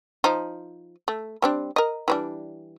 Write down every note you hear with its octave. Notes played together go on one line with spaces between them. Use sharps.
F3 D#4
A3
G3 C4 D4
A#4 D#5
E3 G3 D4